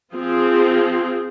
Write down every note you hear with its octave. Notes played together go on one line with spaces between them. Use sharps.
F3 C4 F4 G#4